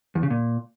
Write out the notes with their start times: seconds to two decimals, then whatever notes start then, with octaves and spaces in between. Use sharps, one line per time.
0.15 E2
0.23 C#3
0.30 A#2